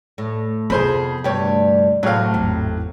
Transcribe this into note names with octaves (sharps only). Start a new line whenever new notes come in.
A2
F2 C3 B3 G#4 C5 B5
D2 G2 G4 C#5
A2 C3 F#3 G4 F5
G#1 E2